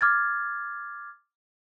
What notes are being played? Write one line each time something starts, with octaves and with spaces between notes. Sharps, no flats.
D6 F6 G#6 A6